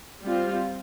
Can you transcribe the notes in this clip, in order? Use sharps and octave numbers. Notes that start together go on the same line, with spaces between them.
G3 C4 F4